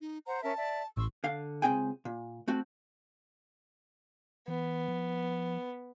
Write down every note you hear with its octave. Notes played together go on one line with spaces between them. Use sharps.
D#4
C5 F#5 A#5
C#4 A#4 E5 A5
D5 E5
A1 C6 C#6 E6
D3 F5
C#2 A#3 C4 G#4 G5 G#5
A#2
A3 C4 F#4
E3 B3
F3